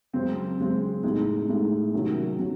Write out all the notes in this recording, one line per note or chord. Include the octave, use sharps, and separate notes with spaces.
F#2 C#3 G#3 C4
F#2 C#3 G#3 C4
A2 G#3 D#4
A2 G#3 D#4
C3 D#3 F#3 C#4
C3 D#3 F#3 C#4